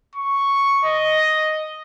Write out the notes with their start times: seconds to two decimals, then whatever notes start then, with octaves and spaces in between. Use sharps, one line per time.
0.16 C#6
0.85 D#5